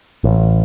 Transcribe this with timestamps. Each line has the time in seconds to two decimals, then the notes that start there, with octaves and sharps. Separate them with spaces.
0.24 A1